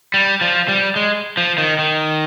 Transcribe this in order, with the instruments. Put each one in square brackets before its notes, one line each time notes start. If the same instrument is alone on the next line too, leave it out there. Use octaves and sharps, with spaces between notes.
[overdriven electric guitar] G3
F3
G3
G#3
F3
D#3
D#3